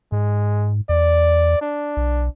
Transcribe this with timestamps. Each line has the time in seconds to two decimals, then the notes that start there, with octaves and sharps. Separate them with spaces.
0.12 G#2 G#3
0.89 E2 D5
1.61 D4
1.97 B1